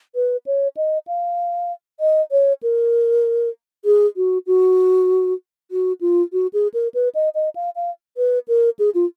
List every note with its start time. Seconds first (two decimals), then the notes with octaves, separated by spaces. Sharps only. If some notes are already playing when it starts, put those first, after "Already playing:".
0.15 B4
0.46 C#5
0.77 D#5
1.07 F5
2.00 D#5
2.32 C#5
2.63 A#4
3.85 G#4
4.17 F#4
4.47 F#4
5.71 F#4
6.01 F4
6.33 F#4
6.53 G#4
6.74 A#4
6.94 B4
7.15 D#5
7.35 D#5
7.56 F5
7.76 F5
8.17 B4
8.48 A#4
8.79 G#4
8.95 F4